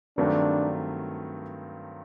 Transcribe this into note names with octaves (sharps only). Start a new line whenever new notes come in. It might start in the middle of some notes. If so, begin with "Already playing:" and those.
G2 D#3 F#3 A3 C4 D4